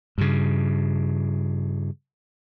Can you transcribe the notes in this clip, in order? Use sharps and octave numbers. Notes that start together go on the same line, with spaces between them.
G2 C#3